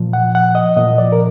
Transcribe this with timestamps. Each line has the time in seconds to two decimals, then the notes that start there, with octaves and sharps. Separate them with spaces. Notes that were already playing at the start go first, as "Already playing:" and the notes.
Already playing: A#2 F3
0.13 F#5
0.35 F#5
0.55 D#5
0.76 A#2 F3 D#5
0.98 D5
1.12 A#4